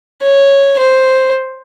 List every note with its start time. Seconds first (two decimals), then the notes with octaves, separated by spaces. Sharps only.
0.22 C#5
0.79 C5